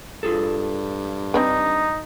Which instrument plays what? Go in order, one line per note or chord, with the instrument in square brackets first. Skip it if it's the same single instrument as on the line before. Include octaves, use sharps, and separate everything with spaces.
[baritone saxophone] G2 [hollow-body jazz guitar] F4 G#4 A4
[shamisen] C4 D4 B4 [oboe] D#4